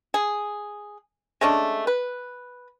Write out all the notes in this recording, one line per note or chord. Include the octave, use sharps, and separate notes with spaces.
G#4
G#3 A3 C#4 D4
B4